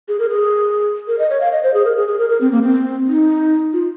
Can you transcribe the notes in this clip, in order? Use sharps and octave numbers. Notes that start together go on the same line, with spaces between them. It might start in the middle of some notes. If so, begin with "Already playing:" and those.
G#4
A#4
G#4
A#4
D#5
C#5
F5
D#5
C5
G#4
A#4
G#4
G#4
A#4
A#4
C4
A#3
C4
D#4
F4